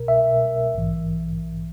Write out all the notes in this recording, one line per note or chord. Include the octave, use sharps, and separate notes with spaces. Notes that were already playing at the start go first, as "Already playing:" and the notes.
Already playing: C2 B2 A#4
E5
A#1 G#2 E3